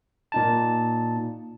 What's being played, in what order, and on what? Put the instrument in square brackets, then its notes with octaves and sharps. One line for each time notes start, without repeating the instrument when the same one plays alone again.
[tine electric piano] A#2 D#4 A5